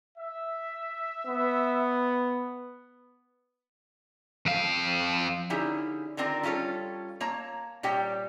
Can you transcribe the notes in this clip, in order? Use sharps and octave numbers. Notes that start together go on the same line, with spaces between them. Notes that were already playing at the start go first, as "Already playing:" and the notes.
E5
B3
F2 F5
D3 C#4 D#4 E4 G4 G#4
D3 D#3 C4 D4 F4 A#4
G3 C#4 F4 A4 C#5
A#3 C#5 A5 A#5
A#2 G3 G4 C#5 G5